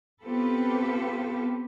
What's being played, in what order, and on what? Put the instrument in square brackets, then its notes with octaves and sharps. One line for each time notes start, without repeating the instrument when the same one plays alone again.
[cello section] B3 C4 F4 G4 A4 B4